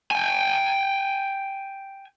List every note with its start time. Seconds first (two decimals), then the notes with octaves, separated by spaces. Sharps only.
0.11 G5 G#5